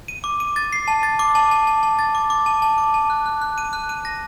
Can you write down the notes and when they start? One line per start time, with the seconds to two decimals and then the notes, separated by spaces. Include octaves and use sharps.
0.08 D#7
0.24 D6
0.40 D#7
0.56 A6
0.73 C7
0.88 A5
1.03 A6
1.19 D6
1.35 A5
1.51 A5
1.67 A5
1.83 A5
1.99 A6
2.15 D6
2.30 D6
2.46 A5
2.62 A5
2.78 D6
2.94 A5
3.10 F#6
3.26 F#6
3.41 F#6
3.58 D#7
3.73 F#6
3.89 D#7
4.05 A#6